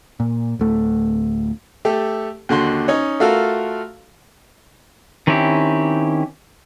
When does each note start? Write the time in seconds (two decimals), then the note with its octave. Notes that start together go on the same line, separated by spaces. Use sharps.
0.20 A#2
0.59 D1 A3
1.85 A3 G4 A4
2.49 D#2 D3 F#4 C6
2.88 C#4 D#4 C#5
3.20 A3 F4 F#4 A4 A#4 F5
5.27 D#3 C4 C#4 E4 G4